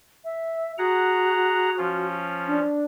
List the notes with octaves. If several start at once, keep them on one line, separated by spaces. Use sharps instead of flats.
E5
F#4 G#4 F#5 A#5
F3 C#4 F4
D4